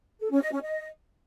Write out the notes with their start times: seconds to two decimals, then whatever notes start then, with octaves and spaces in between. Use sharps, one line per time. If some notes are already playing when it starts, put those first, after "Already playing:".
0.20 A4
0.31 C#4
0.41 D#5
0.52 C#4
0.63 D#5